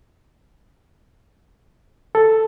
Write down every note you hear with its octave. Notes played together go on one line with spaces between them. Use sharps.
A4